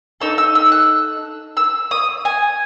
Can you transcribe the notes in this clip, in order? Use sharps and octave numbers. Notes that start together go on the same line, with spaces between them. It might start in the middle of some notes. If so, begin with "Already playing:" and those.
D#4 A4 E6
E6
E6
F#6
E6
D#6
G#5